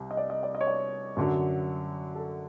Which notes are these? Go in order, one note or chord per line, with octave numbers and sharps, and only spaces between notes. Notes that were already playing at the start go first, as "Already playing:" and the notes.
Already playing: C2 C3
D#5
D5
D#5
D5
D#5
C#5
D5
F#2 D3 F#3
A4